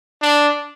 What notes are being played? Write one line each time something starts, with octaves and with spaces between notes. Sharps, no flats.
D4